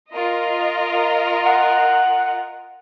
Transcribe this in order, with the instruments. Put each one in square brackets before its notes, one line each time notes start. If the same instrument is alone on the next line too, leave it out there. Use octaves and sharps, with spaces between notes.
[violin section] F4 A#4 D#5
[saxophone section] F#5